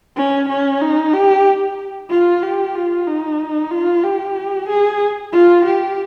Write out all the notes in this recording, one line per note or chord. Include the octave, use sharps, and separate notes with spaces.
C#4
C#4
D#4
G4
F4
G4
F4
D#4
F4
G4
G#4
F4
G4